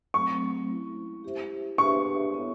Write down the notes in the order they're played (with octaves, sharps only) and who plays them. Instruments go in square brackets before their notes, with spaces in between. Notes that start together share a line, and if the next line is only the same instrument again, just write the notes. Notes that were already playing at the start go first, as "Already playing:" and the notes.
[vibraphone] F#3 A3 C4 [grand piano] C#6
[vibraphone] G#3 C#4 E4
E4 G4 C5 E5
[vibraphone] D4 G4 B4 E5 [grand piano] C#6
[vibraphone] B3 E4 A4 C#5